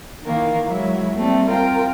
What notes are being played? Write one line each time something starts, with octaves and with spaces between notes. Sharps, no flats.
D#3 E3 A#3
F#3 G#3 E4 C#5 E5
G3 A3 A#3 C4
C4 F4 A#4 G5